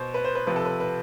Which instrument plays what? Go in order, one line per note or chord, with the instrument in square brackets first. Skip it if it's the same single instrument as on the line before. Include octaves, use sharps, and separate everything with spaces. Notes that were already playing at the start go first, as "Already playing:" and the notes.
Already playing: [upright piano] B2 C5
B4
C5
B4
C3 F3 B4
A4
B4
B4